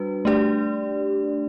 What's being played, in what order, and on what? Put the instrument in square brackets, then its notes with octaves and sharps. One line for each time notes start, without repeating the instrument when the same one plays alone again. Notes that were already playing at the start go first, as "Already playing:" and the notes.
Already playing: [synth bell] G3 D4 F#4 B4
A3 D4 G4 D5